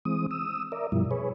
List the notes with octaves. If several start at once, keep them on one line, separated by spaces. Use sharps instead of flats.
E3 G#3 C4 D#6
D#6 E6
A#4 D5 E5
G2 B2 F3 G3 E4
G#4 B4 C#5